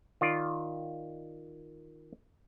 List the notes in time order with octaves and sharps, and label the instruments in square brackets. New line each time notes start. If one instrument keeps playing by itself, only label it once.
[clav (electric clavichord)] D#3 F4 D5